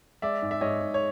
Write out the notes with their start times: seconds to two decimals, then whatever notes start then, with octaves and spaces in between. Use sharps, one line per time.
0.22 G#3 D5 E5
0.42 G#2
0.51 E5
0.61 G#2 C#5 D#5
0.81 G#2
0.94 C#5